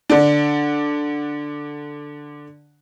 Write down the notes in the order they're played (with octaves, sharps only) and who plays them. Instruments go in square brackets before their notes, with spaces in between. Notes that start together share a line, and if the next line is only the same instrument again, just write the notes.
[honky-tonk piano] D3 D4